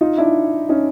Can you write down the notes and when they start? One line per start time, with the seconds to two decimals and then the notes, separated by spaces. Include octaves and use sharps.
0.01 D#4 F4
0.18 D4 E4
0.69 C#4 D#4